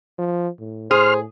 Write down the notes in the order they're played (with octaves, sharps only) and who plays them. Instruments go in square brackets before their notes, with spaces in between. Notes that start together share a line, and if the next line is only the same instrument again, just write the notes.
[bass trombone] F3
A2
[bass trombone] A2 [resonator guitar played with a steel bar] G#4 [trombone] C5 [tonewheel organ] C6 F6